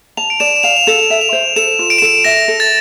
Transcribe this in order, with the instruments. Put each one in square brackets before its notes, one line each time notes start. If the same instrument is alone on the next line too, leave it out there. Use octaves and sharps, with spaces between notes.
[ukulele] A5 [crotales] F7
[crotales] D7
[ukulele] D5 [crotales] E7
[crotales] E7
[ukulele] F5 [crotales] F7
[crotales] F7
[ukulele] A4 [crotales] E7
[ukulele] E5
[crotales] F7
[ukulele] C5
[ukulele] A4 [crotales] E7
[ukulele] F4
[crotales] D7
E7
[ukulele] A4 [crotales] D7
[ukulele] E5 [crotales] A#6
[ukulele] A4
[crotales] A6